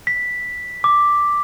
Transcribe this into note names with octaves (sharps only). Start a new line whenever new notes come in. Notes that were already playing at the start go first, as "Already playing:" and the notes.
B6
D6